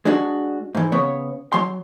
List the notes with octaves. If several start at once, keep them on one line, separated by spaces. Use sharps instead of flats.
G#3 D4 F#4
G#2 E3
C#3 B3 C#5
F#3 C6